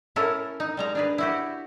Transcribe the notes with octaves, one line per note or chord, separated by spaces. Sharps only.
C#4 E4 A4 A#4
D#4
G3 G#3 A#5
D4 G#4 B4
E4 F#4 G4